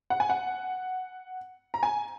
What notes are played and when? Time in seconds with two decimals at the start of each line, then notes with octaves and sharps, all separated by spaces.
0.10 F#5
0.20 G#5
0.30 F#5
1.74 A#5
1.83 G#5